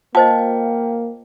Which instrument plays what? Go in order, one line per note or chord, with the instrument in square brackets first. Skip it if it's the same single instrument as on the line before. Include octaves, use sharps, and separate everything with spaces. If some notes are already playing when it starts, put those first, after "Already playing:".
[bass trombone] A#3 [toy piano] F4 C5 D#5 [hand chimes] F5 G5 [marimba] A5